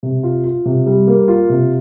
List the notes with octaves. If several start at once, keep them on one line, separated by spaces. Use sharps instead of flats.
C3
F4
F4
C3
G3
A#3
F4
C3